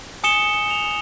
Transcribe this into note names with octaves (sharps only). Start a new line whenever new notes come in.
G#5 D#6 C#7 E7 G7
F7